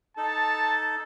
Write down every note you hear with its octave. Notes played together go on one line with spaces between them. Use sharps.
D#4 A4 A5